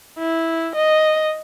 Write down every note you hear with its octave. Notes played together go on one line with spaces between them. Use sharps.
E4
D#5